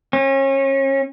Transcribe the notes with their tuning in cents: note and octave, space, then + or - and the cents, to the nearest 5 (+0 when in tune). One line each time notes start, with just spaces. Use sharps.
C#4 -35